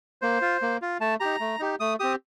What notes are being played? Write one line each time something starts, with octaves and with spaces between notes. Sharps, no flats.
A#3 C5
F4
A#3
F4
A3 A5
D#4 G4 A#5
A3
D#4 G4
A3 D#6
C4 G4 D#6